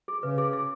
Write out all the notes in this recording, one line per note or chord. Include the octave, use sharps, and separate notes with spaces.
G#4
C#3 B4
G#4
G#4